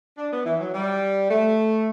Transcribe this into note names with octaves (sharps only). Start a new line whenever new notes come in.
D4
B3
E3
F#3
G3
A3